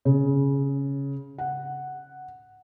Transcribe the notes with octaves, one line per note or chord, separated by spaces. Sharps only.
C#3
F#5